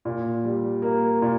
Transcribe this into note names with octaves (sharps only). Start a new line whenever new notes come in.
A#2
G3
A#3
A#2